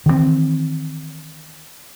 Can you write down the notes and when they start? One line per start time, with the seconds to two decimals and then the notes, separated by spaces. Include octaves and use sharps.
0.06 D#3 E3 G3 C4